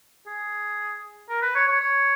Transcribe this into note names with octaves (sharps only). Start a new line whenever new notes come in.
G#4
A#4
B4
C#5
C#5
C#5